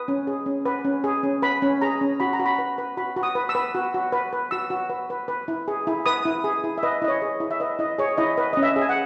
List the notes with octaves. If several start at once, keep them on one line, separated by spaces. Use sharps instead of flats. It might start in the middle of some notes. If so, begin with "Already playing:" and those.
Already playing: B4 D#6
C#4
G#4
C#4
B4
C#4
G#4
C#4
B4 B5
C#4
G#4 A#5
C#4
F#4 B5
A#5
F#4
B5
B4
B4
F#4 B5
F#4
D#6
B4
E6
B4
F#4
F#4
B4
B4
F#4 E6
F#4
B4
B4
B4
E4
G#4
E4
B4 D#6
E4
G#4
E4
E5
B4 D#5
E4 D#5
C#5
G#4
E4
E5
B4 D#5
E4 D#5
G#4 C#5
E4 D#5
B4
C#4 D#5
E5
G#4
G#5
F#5